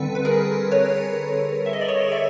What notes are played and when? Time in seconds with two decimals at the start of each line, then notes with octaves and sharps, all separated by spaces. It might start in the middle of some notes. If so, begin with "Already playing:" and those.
Already playing: D3 G3 C4 A4 B4
0.15 B4
0.25 G#4 A#4
0.71 B4 C#5
1.66 E5
1.73 D#5
1.81 D5
1.89 C#5 D#5
2.12 D5 E5